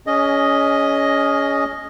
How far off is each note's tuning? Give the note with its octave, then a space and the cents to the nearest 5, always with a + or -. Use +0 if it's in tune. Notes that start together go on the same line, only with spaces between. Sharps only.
C#4 +20 G#4 +0 D#5 +0